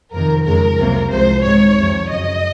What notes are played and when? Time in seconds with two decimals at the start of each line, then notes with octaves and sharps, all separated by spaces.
0.12 F2 C3 D#3 A#4
0.45 F2 C#3 G#3 A#4
0.78 C2 C3 F#3 A#3
1.11 C2 C3 F3 G#3 C5
1.44 G#2 D#3 G#3 C#5
1.77 F2 C3 F3
2.09 F#2 C#3 F#3 D#5